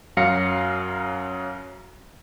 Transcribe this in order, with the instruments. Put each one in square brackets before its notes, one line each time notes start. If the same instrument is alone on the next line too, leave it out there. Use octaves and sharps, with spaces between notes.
[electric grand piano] F#2 F#3 F5 A#6 C#7